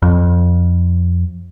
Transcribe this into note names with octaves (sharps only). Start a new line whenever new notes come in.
F2